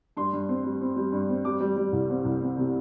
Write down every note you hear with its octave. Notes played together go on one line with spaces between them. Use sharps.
G2 C6
G2
C4
G3
C4
G3
G2
C4
G3 D6
G3
G3
C2
C4
C2
C4
C3